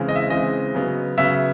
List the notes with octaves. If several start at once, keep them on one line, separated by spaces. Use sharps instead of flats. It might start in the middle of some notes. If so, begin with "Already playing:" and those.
Already playing: C#3 E3 G#3 C4
D#5
E5
C#3 E3 G#3 C4 D#5
C#3 F#3 B3
C#3 F#3 B3 E5